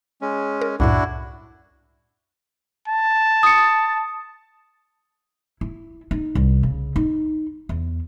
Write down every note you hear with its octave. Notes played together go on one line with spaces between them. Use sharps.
G#3 C#4
A#4
C2 F#2 A2 D4 E4 F#4
A5
D#6 C#7
E4
D#4
C2
C#3
D#4
E2